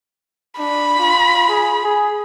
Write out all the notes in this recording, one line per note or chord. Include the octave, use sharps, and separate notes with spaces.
D4 B5
F4
G#4
G#4